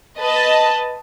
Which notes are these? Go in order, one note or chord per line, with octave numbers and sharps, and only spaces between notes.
B4 D#5 A5